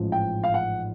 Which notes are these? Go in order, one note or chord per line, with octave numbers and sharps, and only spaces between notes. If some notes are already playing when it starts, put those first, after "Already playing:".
Already playing: A1 G#2 F3
G5
F5
F#5